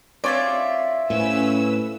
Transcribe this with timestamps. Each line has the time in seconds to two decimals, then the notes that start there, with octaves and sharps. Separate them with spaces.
0.24 C4 F4 C#5 D5 E5
1.10 A2 C#4 B4 E6